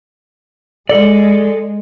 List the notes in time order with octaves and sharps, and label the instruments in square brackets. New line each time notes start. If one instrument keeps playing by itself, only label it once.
[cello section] G#3 [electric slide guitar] A4 D5